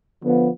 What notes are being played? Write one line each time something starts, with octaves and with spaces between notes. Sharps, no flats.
D3 F3 B3